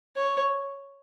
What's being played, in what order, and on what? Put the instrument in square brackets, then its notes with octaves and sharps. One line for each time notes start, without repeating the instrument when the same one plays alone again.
[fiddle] C#5